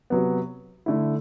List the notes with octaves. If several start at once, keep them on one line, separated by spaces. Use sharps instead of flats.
C3 F#3 B3
D3 A3 E4